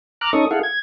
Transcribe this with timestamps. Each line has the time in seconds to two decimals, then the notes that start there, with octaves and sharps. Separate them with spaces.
0.21 A#5 D6 F6 F#6
0.33 C#4 D#4 A4 C#6 D#6
0.51 E4 G#4 A4 F5 F#5
0.63 G#6